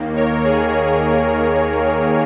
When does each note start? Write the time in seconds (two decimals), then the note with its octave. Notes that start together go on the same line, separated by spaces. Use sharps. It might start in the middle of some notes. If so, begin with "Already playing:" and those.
Already playing: D#2 D#3 A#3
0.16 A#4 C#5
0.44 G#4
0.72 G#4